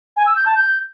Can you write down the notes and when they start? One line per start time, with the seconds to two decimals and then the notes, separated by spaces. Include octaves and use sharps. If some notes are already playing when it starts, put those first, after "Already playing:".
0.17 G#5
0.26 E6
0.36 G6
0.46 A5
0.55 G6